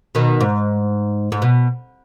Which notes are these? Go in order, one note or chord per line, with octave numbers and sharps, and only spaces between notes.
B2 D#3
G#2
G#2
B2